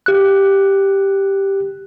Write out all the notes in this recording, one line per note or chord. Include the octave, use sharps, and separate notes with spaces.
G4 F#6